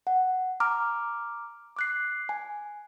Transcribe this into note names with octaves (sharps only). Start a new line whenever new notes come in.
F#5
A#5 D6 F6
D6 F#6 C7
G#5